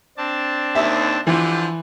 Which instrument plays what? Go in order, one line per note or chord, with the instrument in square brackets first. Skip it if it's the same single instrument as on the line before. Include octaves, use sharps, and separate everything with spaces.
[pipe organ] C4 D4 A5
[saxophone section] D#2 [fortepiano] E5
[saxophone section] D3 F3 [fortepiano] E3 [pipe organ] G4